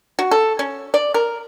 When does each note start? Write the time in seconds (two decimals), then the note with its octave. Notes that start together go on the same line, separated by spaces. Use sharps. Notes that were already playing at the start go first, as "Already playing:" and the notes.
0.19 F#4
0.31 A4
0.59 C#4
0.94 D5
1.14 A#4